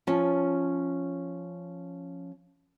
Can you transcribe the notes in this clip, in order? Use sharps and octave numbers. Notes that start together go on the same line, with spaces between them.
F3 C#4 A5